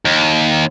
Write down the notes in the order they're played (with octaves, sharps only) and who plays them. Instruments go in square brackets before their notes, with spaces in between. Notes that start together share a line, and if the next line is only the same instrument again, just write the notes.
[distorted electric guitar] D#2